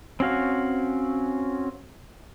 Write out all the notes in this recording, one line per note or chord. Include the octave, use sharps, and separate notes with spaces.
C4 C#4 F#4 F5